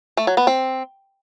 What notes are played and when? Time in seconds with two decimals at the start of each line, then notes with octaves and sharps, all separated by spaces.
0.17 A3
0.27 F#3
0.37 B3
0.47 C4